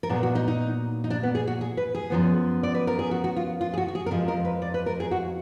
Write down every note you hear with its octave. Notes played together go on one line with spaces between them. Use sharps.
A#4
A#2 F#3 B3 G#4
F#4
D#4
D#4
D#4
D4
B3
G#4
F#4
G#4
B4
G#4
F#2 F3 B3
D5
B4
A#4
G#4
F#4
F#4
F4
F4
G#4
F#4
F#4
G#4
A#4
F2 F3 G#3 G#4
A#4
B4
D5
B4
A#4
G#4
F#4